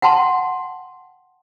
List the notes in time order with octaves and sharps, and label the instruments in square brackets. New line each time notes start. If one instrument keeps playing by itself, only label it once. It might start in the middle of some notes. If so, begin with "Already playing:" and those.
[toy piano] F#5 G5 A5 C6